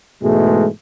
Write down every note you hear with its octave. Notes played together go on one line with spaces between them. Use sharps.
G#2 B2 E3 G#3 A3